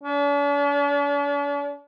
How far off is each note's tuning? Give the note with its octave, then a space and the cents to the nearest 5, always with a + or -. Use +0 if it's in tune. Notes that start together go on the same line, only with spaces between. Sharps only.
D4 -45